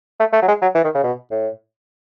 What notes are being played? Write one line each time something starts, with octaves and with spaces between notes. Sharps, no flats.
A3
A3
F#3
G#3
F#3
E3
D#3
C#3
B2
A2